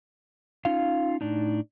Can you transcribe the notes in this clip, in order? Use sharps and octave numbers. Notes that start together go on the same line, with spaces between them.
C#4 D#4 F4 F5
A2 D4 D#4